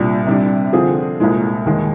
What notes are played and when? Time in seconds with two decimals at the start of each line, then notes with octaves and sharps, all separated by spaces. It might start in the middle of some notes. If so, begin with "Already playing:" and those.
Already playing: C2 A#2 G3 D4
0.27 C3 G3 D4
0.73 D3 F3 C4 F4 G#4
1.20 C2 A#2 G#3
1.66 D#2 D#3 G#3